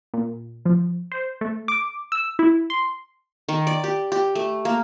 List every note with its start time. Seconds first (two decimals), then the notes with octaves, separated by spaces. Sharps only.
0.14 A#2
0.65 F3
1.12 C5
1.41 A3
1.68 D6
2.12 E6
2.39 E4
2.70 C6
3.49 D#3
3.67 D5
3.84 G4
4.12 G4
4.35 A3
4.65 A#3